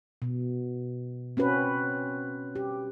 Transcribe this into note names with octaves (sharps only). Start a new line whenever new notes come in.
B2
C4 C#4 F#4 B4
G4